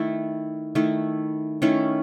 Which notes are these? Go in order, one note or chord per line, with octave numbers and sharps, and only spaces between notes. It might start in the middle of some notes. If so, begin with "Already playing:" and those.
Already playing: D#3 A3 E4
D#3 A3 E4
D#3 A3 C#4 E4